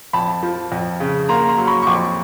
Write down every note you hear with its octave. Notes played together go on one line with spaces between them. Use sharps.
F2 A5 B5
F3
F2
C#3
A#3 A#5 C6
A#5 C6
F#3
B5 C#6
C#6
F2 C6 D6